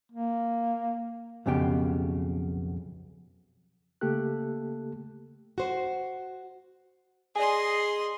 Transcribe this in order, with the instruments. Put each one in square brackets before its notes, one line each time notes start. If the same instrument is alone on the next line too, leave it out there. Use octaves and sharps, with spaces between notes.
[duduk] A#3
[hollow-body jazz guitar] B1 F2 C#3 B3 G4 G5
[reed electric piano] C#3 A3 A#3 G4 A4 F#6
[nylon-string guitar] F#4 C5
[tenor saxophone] G#4 [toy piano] D5 G#5 [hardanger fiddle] D#5 C6